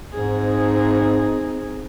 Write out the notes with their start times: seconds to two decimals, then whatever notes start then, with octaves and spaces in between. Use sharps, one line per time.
0.14 G#2 C4 D#4 G#4